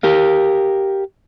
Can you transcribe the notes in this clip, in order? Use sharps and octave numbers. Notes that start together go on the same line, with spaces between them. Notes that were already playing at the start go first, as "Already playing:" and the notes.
G4 A#4 F5